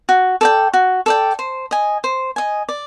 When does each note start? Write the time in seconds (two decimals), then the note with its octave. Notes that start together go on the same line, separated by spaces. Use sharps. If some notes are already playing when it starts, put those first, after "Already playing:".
0.09 F#4
0.41 A4 D5 G5
0.73 F#4
1.06 A4 D5 G5
1.39 C5
1.71 D#5 G#5
2.04 C5
2.36 D#5 G#5
2.69 D5